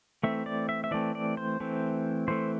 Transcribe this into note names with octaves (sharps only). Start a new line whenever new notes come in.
E3 A3 C4 E5
D5
E5
E5
E3 A3 C4 D5
D5
C5
E3 A3 C4
E3 A3 C4 C5